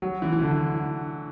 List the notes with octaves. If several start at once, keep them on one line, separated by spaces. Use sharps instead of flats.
F#3
E3
E3
D3